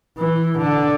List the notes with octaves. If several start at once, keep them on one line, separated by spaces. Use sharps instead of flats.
E3
D3